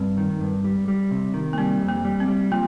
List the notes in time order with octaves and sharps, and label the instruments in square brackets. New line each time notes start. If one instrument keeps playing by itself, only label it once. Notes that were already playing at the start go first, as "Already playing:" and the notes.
Already playing: [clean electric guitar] G2 [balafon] C4
[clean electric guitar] D#3
G2
G3
G3
C3
D#3
[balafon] A#3
[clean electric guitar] G3 [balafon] C4
[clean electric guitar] F2
[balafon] A#3
[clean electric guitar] G3
[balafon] C4
[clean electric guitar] G3
[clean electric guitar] F3 [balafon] A#3